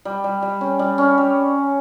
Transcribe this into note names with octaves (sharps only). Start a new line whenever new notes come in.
G3
G3
G3
C#4
G3
C#4
G3